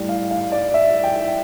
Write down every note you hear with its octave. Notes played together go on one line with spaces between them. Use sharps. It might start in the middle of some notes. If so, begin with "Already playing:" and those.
Already playing: A2 G3
F5
F5
D5
E5
G5